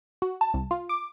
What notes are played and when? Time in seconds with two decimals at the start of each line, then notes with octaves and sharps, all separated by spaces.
0.22 F#4
0.41 A5
0.54 C2
0.71 F4
0.89 D6